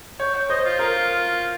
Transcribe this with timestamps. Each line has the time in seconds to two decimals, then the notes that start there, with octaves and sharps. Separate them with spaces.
0.20 C#5 G5
0.35 G5
0.50 C5 D#5
0.65 F4
0.79 F4 A#4